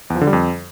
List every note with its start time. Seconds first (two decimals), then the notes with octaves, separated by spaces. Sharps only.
0.10 E2
0.16 F3
0.21 D3
0.27 G3
0.33 F2